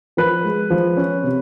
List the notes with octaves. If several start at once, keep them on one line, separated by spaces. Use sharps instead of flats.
F3 B4
G#3
F3
C#4
C3